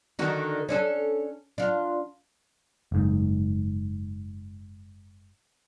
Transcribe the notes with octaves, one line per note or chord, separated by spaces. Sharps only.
D3 D#3 F#4
C#4 D4 A4
D4 F4
F#1 G#2